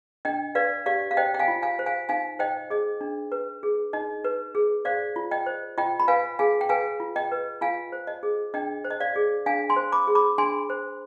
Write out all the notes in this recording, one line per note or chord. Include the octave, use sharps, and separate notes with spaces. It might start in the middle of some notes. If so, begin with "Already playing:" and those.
D4 D#5 G5
B4 D5 F5
G4 D5 F5
F5
C5 D#5 G5
G5
F5 G#5
F4
F5 G#5
C5
F5 G#5
D#4 F5 G#5
C5 D#5 G5
G#4 D#5
D4
B4
G#4
D#4 D#5
B4
G#4
C5 D5 F5
F4
D#5 G5
C5
F4 D#5 G5
B5
B4 F5 G#5
G#4 F5 G#5
G5
B4 F5 G#5
F4
D#5 G5
B4
F4 F5 G#5
C5
D#5
G#4
D4 D#5 G5
C5
D#5
D5 F5
G#4
D4 F5 G#5
G#5 C6
C5
B5 D6
G#4
B5 D6
D4 G#5 C6
C5